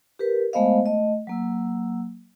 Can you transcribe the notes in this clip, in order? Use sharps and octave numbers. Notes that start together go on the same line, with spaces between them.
G4 A#4 B4
G#3 A3 B3 C5 D#5 F5
A3 D#5
F#3 A#3 E6